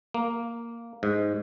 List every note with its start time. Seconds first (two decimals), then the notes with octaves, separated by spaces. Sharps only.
0.14 A#3
1.03 G#2